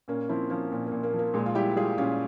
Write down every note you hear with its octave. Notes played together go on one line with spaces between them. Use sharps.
A#2 A#3 C#4
F3 C4 E4
F3 A#3 C#4
A#2
A#3
A#2
A#3
F3
A#3
A#2 G#3
F4
G3 E4 G4
G3 F4 G#4
A#2 C#4 F4